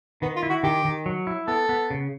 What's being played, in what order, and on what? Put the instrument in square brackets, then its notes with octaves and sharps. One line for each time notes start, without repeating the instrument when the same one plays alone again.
[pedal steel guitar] D#3 [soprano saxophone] B3
[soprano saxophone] F4
[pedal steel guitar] E4
[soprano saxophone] F#4
[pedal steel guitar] D#3 [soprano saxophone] G4
[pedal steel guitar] D#3
F#3
E4
[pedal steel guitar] B3 [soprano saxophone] A4
[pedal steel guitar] B3
C#3